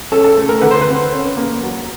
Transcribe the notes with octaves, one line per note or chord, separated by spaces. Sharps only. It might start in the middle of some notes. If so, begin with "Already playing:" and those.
C#4 A4
A4
A3
A#4
D3 B4
C5
B4
C4
C#4
A#3
F#3